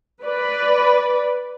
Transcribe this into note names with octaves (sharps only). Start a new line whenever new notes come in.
B4 D5